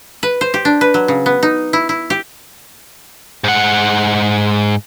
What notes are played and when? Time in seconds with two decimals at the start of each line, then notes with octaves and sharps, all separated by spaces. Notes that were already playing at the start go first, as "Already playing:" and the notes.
0.23 B4
0.41 C5
0.54 G4
0.65 D4
0.81 B4
0.94 F#3
1.08 C#3
1.26 B3
1.43 D#4
1.73 E4
1.89 E4
2.10 G4
3.44 G#2 F#5